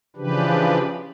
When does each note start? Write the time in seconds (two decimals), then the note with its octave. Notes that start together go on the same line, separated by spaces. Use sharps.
0.16 C#3 E3 F3 D4 G4 B4